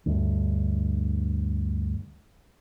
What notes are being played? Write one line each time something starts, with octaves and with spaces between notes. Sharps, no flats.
D2 G2